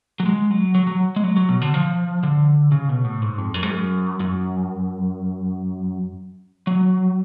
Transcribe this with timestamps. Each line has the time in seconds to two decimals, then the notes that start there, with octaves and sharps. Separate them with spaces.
0.20 F#3
0.26 G#3
0.51 F#3
0.75 F#3
0.87 F#3
1.16 G#3
1.24 F#3
1.37 F#3
1.49 B2
1.62 D3
1.74 F3
2.23 D3
2.72 C#3
2.89 B2
3.04 A2
3.22 G#2
3.38 F2
3.54 F#2
3.63 G#2
3.71 F#2
4.20 F#2
6.67 F#3